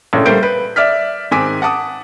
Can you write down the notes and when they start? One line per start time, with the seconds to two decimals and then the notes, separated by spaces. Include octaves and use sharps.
0.13 A#1 A2 C#3
0.26 G3 A3 A#3 C5 G6 D7
0.43 B4
0.76 D5 E5 F6 B6
1.31 G#2 D#3 C4 G#5 D6 B6
1.62 F#5 A5 D6 D#6